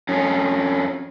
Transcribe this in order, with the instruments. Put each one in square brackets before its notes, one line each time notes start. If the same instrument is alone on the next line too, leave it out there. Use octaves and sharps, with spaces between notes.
[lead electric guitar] F2 C#4